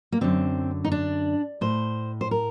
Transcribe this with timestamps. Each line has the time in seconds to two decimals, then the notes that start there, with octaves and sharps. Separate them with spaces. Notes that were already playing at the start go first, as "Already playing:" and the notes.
0.12 A#3
0.21 F#2 D3 C4
0.84 D#4
0.92 D4
1.61 A2 C5
2.21 C5
2.31 A#4